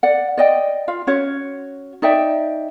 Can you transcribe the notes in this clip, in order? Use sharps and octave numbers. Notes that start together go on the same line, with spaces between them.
D5 F#5
D5 D#5 G5
F4 F5
C#4 F#4 C#5
D#4 D5 E5 G5